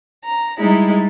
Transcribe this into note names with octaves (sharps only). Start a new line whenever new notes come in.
A#5
G3 G#3 D#4 E4